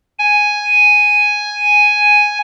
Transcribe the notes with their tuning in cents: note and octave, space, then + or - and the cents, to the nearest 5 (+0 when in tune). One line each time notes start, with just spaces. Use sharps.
G#5 +0